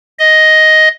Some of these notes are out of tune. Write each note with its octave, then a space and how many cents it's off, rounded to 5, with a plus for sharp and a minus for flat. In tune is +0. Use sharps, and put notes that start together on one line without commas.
D#5 +5